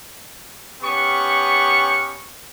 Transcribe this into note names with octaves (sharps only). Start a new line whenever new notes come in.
B3 C#4 G4 C#6